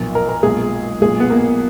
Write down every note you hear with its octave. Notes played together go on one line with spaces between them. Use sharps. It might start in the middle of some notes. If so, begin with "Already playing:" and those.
Already playing: B1 A#2 F3 A#3
A#4
A#4
B1 A#2 G#3 G#4
B1 A#2 G#3 G#4
B3
A#3